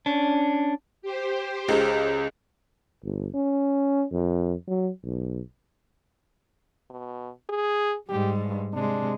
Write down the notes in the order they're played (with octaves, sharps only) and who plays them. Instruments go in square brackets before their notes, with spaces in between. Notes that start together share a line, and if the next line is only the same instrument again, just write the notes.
[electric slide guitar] C#4 D4
[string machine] G4 C5
[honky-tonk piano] C#2 C#3
[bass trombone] G1
C#4
F2
F#3
B1
[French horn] B2
G#4
[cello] G#2 G3 [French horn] G4
[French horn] G2
[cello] C3 G#3 [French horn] D4